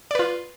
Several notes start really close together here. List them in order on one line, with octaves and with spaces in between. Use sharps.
D5 B4 F4